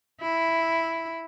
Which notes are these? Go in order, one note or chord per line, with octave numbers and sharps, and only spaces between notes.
E4